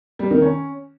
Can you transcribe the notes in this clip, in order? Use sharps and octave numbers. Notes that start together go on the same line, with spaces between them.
G3
D#3
C#4